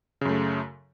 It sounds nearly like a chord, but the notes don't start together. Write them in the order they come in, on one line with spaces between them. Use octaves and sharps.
C#3 F#2 A3